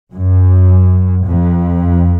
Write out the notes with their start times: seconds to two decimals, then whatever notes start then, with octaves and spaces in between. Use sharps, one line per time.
0.13 F#2
1.27 F2